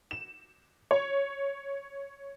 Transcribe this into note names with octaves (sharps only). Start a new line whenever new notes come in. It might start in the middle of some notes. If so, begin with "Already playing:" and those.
E7
C#5